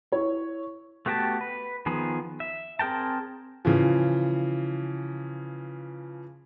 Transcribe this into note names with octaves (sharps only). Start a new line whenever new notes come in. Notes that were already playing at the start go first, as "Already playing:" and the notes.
E4 C#5
A3 B3 F#4 G4 A5
B4
D#3 F3 B3 G#4
E5
C4 G#4 A#4 G5 A5
C#3 E3 F3